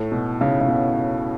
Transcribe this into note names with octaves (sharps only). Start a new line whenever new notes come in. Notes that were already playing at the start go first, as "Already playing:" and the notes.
Already playing: A2
B2
C#3
C#3
B2